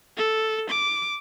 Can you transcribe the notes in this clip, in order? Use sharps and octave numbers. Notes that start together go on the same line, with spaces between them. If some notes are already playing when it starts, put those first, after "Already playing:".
A4
D6